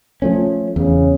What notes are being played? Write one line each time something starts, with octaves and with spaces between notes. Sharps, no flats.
F3 A3 C#4
E2 C#3